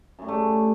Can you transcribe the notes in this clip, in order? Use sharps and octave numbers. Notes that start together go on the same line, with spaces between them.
F#2 A2 G3 A3